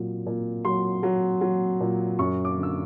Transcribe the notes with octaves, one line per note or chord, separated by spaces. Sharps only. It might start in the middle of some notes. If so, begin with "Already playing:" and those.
Already playing: A#2 F#3
A#2
F#3 C6
F#3
F#3
A#2
F#2 C#6
D6
D3
E6